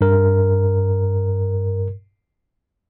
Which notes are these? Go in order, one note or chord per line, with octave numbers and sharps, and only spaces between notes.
G2 A#4